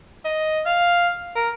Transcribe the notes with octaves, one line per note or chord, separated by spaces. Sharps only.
D#5
F5
A#4